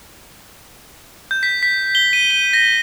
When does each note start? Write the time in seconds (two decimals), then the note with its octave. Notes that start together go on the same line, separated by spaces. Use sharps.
1.31 G6
1.43 B6
1.63 B6
1.95 G7
2.13 D#7
2.30 D#7
2.53 A#6